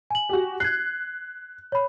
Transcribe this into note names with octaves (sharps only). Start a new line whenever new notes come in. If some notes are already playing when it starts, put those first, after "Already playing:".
G#5 F#7
F#4 G4
F#6 G#6 C7
C#5 B5